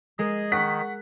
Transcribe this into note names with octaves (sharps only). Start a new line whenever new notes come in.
G#3 G#4 A#4 D#5
D#3 F#5 C#6 F#6 B6